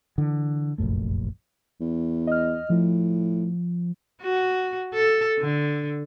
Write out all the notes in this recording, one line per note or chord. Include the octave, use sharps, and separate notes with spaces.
D3 E3
F1 A#1 F#2 A3
E2
D#5 F6
A2 F3
F#4
A4
D3